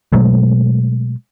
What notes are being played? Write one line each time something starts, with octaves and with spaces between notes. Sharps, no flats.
B2 F#3 G#3 A3